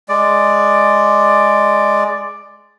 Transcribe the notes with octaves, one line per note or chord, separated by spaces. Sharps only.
G#3 D5